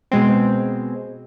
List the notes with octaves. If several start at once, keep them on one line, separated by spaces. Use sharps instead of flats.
B2 G#3 C4